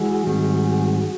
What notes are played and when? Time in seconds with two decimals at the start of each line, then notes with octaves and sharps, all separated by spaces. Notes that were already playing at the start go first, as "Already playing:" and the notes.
Already playing: E3 G#3 F#4 G#4
0.26 G#2 D#3 G3 C4